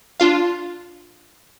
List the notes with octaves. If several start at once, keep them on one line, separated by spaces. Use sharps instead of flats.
D4 F4 F5